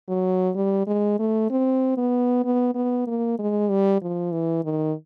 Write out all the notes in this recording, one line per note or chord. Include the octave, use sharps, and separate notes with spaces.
F#3
G3
G#3
A3
C4
B3
B3
B3
A#3
G#3
G3
F3
E3
D#3